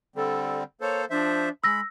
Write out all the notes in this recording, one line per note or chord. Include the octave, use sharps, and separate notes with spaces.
D3 G3 C4 A4
A#3 A4 C5 C#5
F3 D4 C5 E5
G#3 B5 E6 A#6